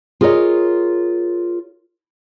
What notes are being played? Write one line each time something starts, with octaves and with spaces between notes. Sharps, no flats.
F4 G#4 A#4 B4 C#5 D#5